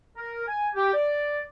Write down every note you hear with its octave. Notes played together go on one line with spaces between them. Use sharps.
A#4
G#5
G4
D5